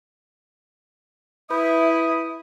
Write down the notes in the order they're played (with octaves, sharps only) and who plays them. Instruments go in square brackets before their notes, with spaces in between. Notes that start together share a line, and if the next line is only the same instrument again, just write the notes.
[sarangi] E4 [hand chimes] B4 B5 G6 [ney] E5 [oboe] D#6